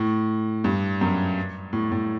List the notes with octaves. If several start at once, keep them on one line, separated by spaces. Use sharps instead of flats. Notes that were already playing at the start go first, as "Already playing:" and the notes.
Already playing: A2
G2
F#2
A2
A2